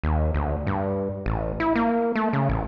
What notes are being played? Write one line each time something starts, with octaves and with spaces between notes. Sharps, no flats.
D#2
D2
G2
A1
E4
A#3
A3
C#3
A1